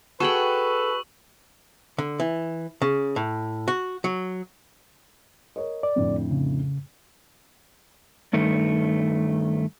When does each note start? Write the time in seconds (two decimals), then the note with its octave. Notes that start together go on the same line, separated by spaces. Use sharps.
0.20 F#4 G#4 A4 B4 G5 C#6 F#7
1.98 D3
2.20 E3
2.82 C#3
3.16 A2
3.68 F#4
4.04 F#3
5.56 A#4 C#5 D#5
5.83 D5
5.96 F2 A2 D3
6.31 C#3
8.33 G2 D#3 A3